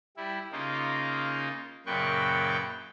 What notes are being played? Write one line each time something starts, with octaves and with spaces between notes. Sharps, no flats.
G3 E4
C#3 A#3 D#4 F4
F#2 A#2 C#3 B4 G5 C#6